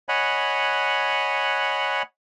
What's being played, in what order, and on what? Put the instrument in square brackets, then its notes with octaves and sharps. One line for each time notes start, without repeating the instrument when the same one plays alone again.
[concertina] C#5 D#5 F#5 G#5 B5 F#6